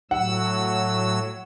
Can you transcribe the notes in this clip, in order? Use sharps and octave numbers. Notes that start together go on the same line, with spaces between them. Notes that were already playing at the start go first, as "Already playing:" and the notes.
A2 F#3 F#5 E6